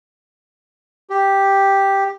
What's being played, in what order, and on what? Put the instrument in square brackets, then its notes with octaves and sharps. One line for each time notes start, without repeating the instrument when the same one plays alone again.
[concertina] G4